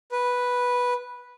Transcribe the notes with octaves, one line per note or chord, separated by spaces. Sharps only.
B4